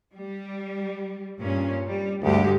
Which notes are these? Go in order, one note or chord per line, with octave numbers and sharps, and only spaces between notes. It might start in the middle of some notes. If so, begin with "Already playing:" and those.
G3
G2 A#2 C#4
G3
D2 G2 G#3 G4